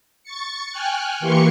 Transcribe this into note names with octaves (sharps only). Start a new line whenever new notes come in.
C#6 A6 C#7
G5 G#5 F6 F#6
E3 A#3 G4 C6 C#6 C#7